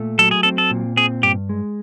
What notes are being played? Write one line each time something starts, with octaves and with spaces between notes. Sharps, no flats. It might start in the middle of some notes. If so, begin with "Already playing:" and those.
Already playing: A#2 A3
F#3 A4
G#4
C4 A4
A4
A#2
C4 G#4
G2 G4
G#3